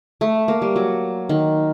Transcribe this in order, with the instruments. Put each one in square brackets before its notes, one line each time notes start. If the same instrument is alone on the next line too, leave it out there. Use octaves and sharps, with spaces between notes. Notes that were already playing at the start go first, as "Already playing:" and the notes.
[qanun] A3
A#3
G3
F#3
D#3